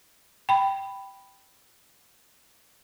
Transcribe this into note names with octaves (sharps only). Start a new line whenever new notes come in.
G5 B5